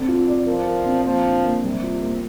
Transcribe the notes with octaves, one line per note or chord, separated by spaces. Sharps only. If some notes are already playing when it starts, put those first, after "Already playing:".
Already playing: D3 C4
F4
D5
F3 A#4
A#4
C4
F3 A#3
D3
A#3
C3 G3
F4
A#3